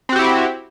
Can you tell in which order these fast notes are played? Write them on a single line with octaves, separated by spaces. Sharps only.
C4 F#4 G4 E4